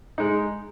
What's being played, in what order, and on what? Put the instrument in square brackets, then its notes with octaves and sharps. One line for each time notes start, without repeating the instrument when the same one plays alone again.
[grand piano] G#3 D#4